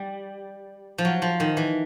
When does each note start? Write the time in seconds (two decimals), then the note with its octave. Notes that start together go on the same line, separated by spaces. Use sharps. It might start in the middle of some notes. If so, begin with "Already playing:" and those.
Already playing: G3
0.98 F3
1.05 F#3
1.22 F3
1.40 D#3
1.57 E3